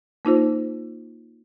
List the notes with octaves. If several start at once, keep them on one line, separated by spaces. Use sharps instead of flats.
A#3 D#4 F4 C5